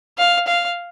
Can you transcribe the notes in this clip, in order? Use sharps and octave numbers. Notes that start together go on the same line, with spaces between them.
F5
F5